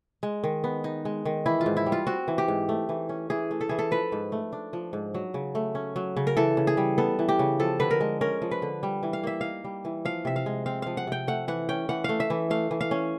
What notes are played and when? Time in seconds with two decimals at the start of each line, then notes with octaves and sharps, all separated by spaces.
0.23 G#3
0.44 D#3
0.64 B3
0.84 D#4
1.05 G#3
1.25 D#3
1.46 E3 E4
1.61 F4
1.66 G#2
1.77 E4
1.86 G3
1.92 F4
2.07 C4 F#4
2.28 E3
2.38 G4
2.48 G#2
2.69 A3
2.89 E3
3.09 C#4
3.30 E3 G#4
3.51 A3
3.61 A4
3.69 E3 G#4
3.79 A4
3.91 F3 B4
4.12 G#2
4.32 A3
4.53 D4
4.73 F3
4.93 G#2
5.14 F#3
5.34 C#3
5.55 A3
5.75 C#4
5.96 F#3
6.17 C#3
6.27 A#4
6.37 E3 A4
6.57 C#3
6.67 G#4
6.77 G3
6.98 B3 A4
7.19 E3
7.29 G4
7.39 C#3
7.60 F3 A4
7.80 D3 B4
7.91 A#4
8.01 G#3
8.21 C#4 A#4
8.42 F3
8.51 B4
8.62 D3
8.83 G3
9.03 E3
9.13 F5
9.23 A#3 E5
9.41 D#4 F5
9.64 G3
9.85 E3
10.05 F3 F5
10.25 C3 E5
10.36 F5
10.46 G#3
10.66 C4 F5
10.82 F3 F5
10.97 F#5
11.07 C3 G5
11.27 A3 F#5
11.48 E3 F#5
11.69 C#4 G5
11.89 E3 F#5
12.04 A3 F5
12.20 E5
12.30 E3
12.50 A3 F5
12.71 E3
12.81 F5
12.91 C#4